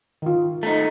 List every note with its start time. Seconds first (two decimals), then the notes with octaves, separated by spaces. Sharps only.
0.22 D#3 F4
0.63 A3 D#4